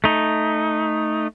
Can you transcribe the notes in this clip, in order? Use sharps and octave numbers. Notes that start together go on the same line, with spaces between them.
A3 D#4